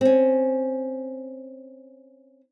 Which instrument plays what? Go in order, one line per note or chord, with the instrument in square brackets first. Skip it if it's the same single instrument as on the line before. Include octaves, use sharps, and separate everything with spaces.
[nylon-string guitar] C4 C#4